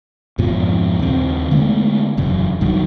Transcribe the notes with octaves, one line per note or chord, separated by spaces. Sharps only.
F2 G#2 B2 F3
D#2 C#3 C4
D3 G#3 A3 B3
E1 F#2 C#3
B1 G2 D#3 F#3